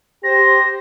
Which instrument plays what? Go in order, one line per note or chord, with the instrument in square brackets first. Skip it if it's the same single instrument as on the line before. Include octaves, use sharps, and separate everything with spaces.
[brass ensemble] G4 C5 [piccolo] A#6